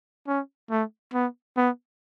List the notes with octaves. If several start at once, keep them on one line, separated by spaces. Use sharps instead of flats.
C#4
A3
B3
B3